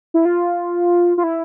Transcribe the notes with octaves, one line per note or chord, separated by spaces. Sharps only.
E4
F4
F4
E4